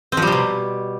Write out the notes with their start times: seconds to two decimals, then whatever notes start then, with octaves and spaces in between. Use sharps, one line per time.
0.12 C4
0.17 F3
0.22 G3
0.27 C3
0.32 B2